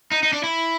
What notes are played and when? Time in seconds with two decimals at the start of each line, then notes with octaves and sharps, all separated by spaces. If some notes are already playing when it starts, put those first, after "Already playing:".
0.11 D#4
0.23 D#4
0.33 D4
0.44 E4